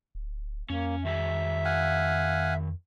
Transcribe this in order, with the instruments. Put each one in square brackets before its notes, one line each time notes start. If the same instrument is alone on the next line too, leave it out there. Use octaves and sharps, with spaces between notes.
[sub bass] D1
[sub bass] F2 [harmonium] A#3 [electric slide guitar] C#4
[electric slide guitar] D#3 F#4 G#4 [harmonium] E5
[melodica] F5 F#5 G#5